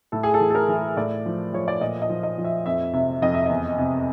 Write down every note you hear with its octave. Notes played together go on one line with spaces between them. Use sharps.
A2 A4
G#4
A4
E3
A4
A#4
E3
G#4
A2 D5
F3
F3 C#5
D5
A#2 D#5
D#5
F3
D#5
F3
E5
F2 E5
C3 E5
F2 D#5
E5
E2 D#5
C3